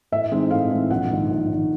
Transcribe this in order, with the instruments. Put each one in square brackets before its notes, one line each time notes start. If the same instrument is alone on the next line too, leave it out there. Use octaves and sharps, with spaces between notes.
[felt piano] A2 E5
E3 G#3 C4 D#4
A2 F5
E3 G#3 C4 D#4
A#1 F#5
G#2 D#3
A#1
G#2 D#3